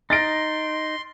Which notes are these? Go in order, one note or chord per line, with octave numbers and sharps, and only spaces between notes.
D#4 C6 A6 A#6 D7